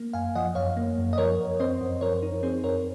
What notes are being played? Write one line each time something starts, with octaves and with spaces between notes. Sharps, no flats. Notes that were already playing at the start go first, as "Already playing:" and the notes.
Already playing: A#3
F#2 F5 G#5
F3 D#5 F#5
F#2 C#5 F5
A#3
F#2
D#5
F3 A#4 C#5
F#2
C4 C5 D#5
F#2
F3 A#4 C#5
D#4
C4 G#4 C5
F#2 A#4 C#5